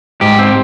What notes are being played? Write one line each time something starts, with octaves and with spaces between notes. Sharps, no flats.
G#2 G4
C4